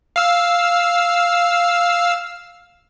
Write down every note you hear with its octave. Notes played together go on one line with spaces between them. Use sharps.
F5 E6